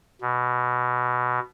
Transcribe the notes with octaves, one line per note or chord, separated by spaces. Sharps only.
B2